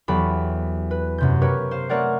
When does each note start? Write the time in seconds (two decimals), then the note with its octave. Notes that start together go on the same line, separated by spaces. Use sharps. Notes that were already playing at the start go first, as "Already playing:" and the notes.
0.08 E2 F#3 G4 A4 G5 B5
0.91 B4
1.18 F#2 C3 G6
1.42 G4 A#4 B4 C#5
1.71 C5 F5
1.89 A3 C4 A#4 C#5 D5 F#5